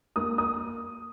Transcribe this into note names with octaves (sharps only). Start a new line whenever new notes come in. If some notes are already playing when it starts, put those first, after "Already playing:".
A#3 D#6
D#6